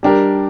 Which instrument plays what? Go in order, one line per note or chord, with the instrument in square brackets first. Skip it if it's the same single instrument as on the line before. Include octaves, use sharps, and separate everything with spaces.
[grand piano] G3 D4 G4 A#4